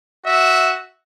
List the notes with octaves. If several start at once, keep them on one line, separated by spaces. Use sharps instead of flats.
F#4 E5